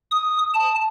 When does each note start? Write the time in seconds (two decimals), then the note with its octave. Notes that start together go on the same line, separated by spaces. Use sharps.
0.11 D#6
0.54 A5